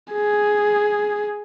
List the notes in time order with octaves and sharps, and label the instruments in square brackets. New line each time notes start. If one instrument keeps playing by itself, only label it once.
[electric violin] G#4